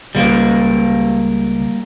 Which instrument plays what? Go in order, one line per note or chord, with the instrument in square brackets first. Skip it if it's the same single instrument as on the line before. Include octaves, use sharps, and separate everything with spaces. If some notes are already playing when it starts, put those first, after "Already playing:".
[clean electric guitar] C#2 [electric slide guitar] G3 A#3